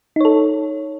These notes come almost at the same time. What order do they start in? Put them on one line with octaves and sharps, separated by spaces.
D#4 C#5 A4